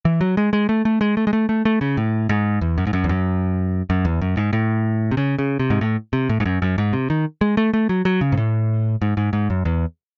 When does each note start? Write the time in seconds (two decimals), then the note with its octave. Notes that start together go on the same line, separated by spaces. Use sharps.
0.05 E3
0.21 F#3
0.37 G#3
0.53 G#3
0.69 A3
0.85 A3
1.01 G#3
1.17 A3
1.27 G#3
1.33 A3
1.49 A3
1.65 A3
1.81 C#3
1.97 A2
2.29 G#2
2.61 E2
2.78 F#2
2.87 G#2
2.93 F#2
3.04 E2
3.09 F#2
3.90 F#2
4.05 E2
4.21 F#2
4.37 G#2
4.53 A2
5.11 C3
5.17 C#3
5.39 C#3
5.60 C3
5.70 G#2
5.81 A2
6.13 C3
6.29 A2
6.40 G#2
6.46 F#2
6.62 F#2
6.78 G#2
6.93 C3
7.10 D#3
7.41 G#3
7.57 A3
7.74 A3
7.89 F#3
8.05 F#3
8.21 C#3
8.32 G#2
8.37 A2
9.02 G#2
9.17 G#2
9.33 G#2
9.50 F#2
9.65 E2